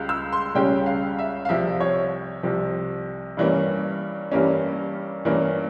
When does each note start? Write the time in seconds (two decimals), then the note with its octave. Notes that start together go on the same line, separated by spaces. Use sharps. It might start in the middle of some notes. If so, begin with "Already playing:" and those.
Already playing: C#2 C#3 G3
0.09 E6
0.33 C6
0.55 C#2 C#3 G3 C#4 G5
0.86 F5
1.19 E5
1.45 F5
1.49 C2 C3 F3 E5
1.81 C#5
2.43 C2 C3 F3
3.37 G2 E3 G3 A#3 C#4
4.32 G2 E3 G3 A#3 C#4
5.25 G2 E3 A#3 C#4